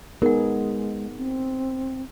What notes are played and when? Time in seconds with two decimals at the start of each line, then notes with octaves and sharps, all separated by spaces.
0.22 G#3 B3 D#4 G#4 A#4 F#5
1.17 C4